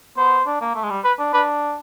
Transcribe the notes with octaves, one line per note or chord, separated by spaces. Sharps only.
B3 C5
D4
A#3
A3
G#3
G3
B4
D4
D4 B4